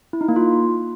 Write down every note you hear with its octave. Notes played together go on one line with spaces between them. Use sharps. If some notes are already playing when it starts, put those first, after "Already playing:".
E4
D#4
A#3
F4